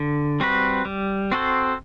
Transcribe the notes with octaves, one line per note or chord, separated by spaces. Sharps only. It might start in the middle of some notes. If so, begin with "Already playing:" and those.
Already playing: D3
G3 C4 F#4 B4
G3
C4 F#4 A4 C5